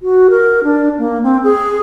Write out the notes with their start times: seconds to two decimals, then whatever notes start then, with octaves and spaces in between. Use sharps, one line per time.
0.01 F#4
0.30 A#4
0.64 D4
0.98 A#3
1.23 C4
1.44 G#4